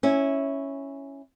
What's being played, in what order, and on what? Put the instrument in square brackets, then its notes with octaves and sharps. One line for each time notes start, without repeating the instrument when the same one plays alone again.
[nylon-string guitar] C#4 E4